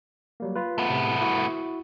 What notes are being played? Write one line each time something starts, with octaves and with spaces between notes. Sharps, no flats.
F#3 G3 A#3
F4 B4
A3 B3
A2 C3
E4 F#4